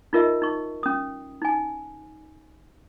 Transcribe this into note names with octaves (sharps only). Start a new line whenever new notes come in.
D#4 F4 A#4 D#5 E5
D#4 C#6
C#4 D#6
D#4 G#5